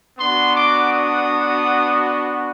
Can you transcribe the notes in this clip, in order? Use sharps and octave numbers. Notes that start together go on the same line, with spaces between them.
B3 D4 F#4 C6
D6
D#6